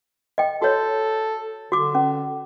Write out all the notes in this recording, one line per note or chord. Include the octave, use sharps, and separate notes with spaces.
D#5 G5
F#4 A4 C#5
D3 F#4 D6
C#4